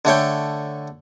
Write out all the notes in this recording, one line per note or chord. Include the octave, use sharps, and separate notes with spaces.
D3 A3 C#5 G5